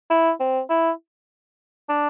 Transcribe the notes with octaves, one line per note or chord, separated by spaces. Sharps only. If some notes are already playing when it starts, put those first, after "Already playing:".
E4
C4
E4
D4